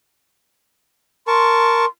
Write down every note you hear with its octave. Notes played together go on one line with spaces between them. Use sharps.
A#4 A5 C6 C#6